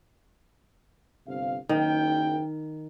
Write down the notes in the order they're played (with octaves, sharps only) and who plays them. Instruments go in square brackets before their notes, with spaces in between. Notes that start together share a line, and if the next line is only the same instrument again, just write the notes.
[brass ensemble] G1 C3 F5
[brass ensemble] F#1 G5 [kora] D#3